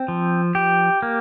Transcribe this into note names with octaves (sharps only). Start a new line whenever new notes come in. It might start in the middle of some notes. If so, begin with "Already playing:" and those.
Already playing: C4
F3
G4
A#3